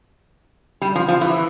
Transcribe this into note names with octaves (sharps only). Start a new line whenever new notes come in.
G3
F3
F3
E3